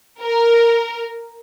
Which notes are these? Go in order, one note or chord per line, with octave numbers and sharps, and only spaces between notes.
A#4